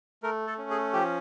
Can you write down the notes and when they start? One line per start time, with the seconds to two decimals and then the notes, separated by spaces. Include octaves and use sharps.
0.23 A3 A#4
0.47 A4
0.58 C#4
0.70 G#4
0.93 F3 G4